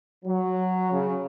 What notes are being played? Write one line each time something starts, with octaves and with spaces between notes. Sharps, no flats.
F#3
C#3